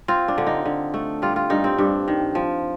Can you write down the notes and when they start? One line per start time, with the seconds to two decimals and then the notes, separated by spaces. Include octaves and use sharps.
0.08 C4 F4
0.28 D4
0.38 D3
0.47 D#4
0.65 D3
0.94 A3
1.22 G3 F4
1.36 F4
1.50 G2 D#4
1.64 C4
1.78 G2 D4
2.08 D#3
2.35 F3